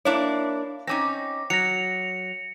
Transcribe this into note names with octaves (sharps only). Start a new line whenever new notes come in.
A#3 D4 E4 C#5 F5
C4 C#4 D#4 D6 A#6
F#3 A#6 C#7 F7